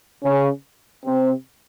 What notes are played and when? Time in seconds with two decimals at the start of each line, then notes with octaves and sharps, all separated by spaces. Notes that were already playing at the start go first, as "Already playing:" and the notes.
0.23 C#3 C#4
1.06 C3 C4